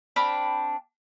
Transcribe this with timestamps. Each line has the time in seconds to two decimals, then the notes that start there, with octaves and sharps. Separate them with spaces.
0.16 C4 D4 F5 B5